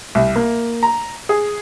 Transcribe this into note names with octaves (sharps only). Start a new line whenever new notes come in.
C2
A#3
A#5
G#4